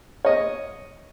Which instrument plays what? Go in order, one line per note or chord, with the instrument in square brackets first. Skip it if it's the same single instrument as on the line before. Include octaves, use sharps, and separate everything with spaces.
[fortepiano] C#5 D#5